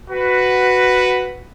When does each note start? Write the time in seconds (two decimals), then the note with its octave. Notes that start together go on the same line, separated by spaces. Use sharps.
0.10 F#4 B4